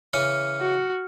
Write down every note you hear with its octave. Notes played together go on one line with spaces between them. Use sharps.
C#3 E3 C#4 F6 C#7
F#4